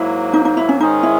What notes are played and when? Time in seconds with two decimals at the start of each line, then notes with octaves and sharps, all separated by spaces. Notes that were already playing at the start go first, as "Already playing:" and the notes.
Already playing: G#2 F#3 A#3 E4
0.33 D#4
0.45 D#4
0.57 E4
0.69 C#4
0.80 G#2 D#3 G#3 C#4 D#4 G#4
1.03 E4